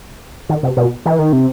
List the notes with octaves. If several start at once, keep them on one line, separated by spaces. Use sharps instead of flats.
D#3
C3
B2
E3
D#3
C3